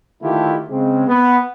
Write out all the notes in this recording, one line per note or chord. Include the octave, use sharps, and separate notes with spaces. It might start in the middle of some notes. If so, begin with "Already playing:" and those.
D3 D#3 A3 E4 F4 G4
C#3 G#3 C4
B3